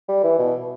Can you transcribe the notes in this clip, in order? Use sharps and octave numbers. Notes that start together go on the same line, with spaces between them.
G3
E3
B2